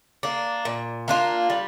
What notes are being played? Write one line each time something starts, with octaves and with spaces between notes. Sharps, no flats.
A#3 D4
A#2
A#3 D4 F4
G3